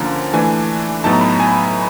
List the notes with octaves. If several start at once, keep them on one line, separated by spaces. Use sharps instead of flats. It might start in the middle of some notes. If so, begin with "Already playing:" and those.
Already playing: D3 F3 A#3 C#4 A#5
E3 A3 D4 G#5
A2 F#3 B3 D#4 A5
A#5
B5
A#5
G#5